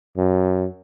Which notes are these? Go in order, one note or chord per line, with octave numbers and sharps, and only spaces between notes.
F#2